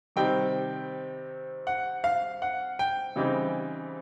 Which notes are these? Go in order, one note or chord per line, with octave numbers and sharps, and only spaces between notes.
C3 D#3 G3 C4 D#4 G5
F#5
F5
F#5
G5
C#3 E3 G3 C4 D#4